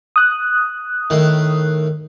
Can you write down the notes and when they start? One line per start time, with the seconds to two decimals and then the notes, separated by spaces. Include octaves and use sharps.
0.16 D#6 F#6
1.10 A2 D#3